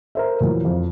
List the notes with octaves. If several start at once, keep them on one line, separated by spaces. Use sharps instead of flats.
A#4 C5 E5
A#2 E3 F#3
F2